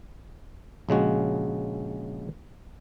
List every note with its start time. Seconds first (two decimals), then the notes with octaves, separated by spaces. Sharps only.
0.89 A#1 C#3 G#3 F#4